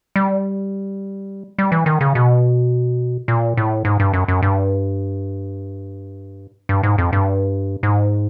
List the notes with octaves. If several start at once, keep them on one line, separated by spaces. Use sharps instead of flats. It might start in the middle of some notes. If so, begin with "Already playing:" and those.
G3
G3
E3
D#3
C#3
B2
A#2
A2
G#2
G2
F#2
F#2
G2
G2
G#2
F2
G2
G#2